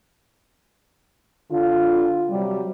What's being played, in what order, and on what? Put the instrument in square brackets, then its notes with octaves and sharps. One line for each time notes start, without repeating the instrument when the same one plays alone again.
[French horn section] D3 F4
C3 F#3 G3